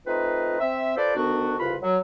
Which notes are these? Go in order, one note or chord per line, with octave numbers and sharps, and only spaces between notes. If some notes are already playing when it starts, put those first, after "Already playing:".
A3 C4 D#4 F4 B4 D#5
C4 E5
F4 A4 B4 C5 D5
D2 D#3 B3 D4 F#4
C2 F2 C#3 F4 B4 B5
F#3